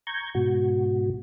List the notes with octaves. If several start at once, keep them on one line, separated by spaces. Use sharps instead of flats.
A#5 C#6 G6 G#6
G#2 B2 F#4